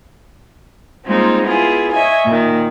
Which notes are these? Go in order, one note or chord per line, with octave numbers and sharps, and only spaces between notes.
G3 G#3 A#3 C4 D#4 F4
B3 E4 F4 G#4
C#5 D#5 E5 G#5
A#2 D#3